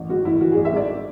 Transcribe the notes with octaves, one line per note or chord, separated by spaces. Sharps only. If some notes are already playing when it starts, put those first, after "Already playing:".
Already playing: A1
G#2 F#4
A1 E4
E3 F#4
G#4
A1
E5
G#2 D5